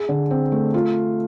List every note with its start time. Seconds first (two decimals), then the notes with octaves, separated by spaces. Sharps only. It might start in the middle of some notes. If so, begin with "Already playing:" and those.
Already playing: G#4
0.09 D3
0.31 C4
0.52 A3
0.74 F4